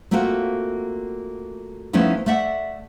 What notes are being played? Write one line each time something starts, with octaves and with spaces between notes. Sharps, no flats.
A3 A#3 C4 F4 F#4
F3 A3 B3 C#4 D#4 E4
A3 D5 E5 F#5